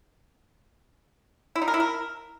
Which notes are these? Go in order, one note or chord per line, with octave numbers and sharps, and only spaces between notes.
E4
D#4
A#4
E4
A#4